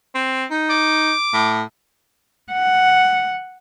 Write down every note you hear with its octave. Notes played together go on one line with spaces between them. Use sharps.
C4
D#4
D6
A2
F#5